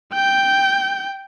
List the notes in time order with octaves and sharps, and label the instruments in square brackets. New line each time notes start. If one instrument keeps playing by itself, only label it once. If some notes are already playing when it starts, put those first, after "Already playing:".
[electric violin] G5 G6